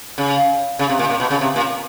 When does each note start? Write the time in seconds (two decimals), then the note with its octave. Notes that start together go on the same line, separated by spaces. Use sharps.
0.18 C#3
0.79 C#3
0.90 C3
0.99 A#2
1.10 A#2
1.20 B2
1.31 C#3
1.41 C3
1.56 A#2